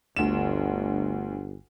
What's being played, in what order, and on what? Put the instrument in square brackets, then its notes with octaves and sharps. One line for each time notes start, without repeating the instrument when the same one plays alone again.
[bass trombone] G1 [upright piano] D2 E7